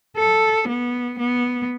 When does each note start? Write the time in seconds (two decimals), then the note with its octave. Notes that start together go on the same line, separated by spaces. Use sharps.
0.17 A4
0.68 B3
1.19 B3